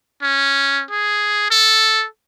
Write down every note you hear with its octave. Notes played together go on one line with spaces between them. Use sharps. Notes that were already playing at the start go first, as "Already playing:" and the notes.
C#4
G#4
A4